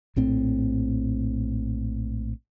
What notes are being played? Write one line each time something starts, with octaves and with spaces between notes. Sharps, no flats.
A#1 A2 C4